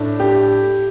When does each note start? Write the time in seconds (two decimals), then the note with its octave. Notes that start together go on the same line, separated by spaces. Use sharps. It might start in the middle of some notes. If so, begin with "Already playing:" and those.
Already playing: A2 A3 D4
0.20 G4